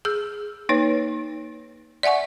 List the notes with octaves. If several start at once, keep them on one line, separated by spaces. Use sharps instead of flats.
G#4 E6 G6
A#3 D#4 B4 C#5
D5 E5 F#5 G#5 C#6